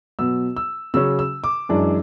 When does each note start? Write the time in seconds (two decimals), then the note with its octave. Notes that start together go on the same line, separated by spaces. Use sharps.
0.19 B2 F#3 B3 E6
0.57 E6
0.94 C#3 F#3 C#4 E6
1.19 E6
1.44 D6
1.69 F#2 E3 G#3 D4